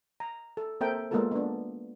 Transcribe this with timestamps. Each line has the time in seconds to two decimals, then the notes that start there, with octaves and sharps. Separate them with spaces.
0.20 A#5
0.57 A4
0.81 A#3 C4 A4 A#4 E5 G5
1.11 G#3 A#3 B3 F4 A4 A#4
1.32 B3 D4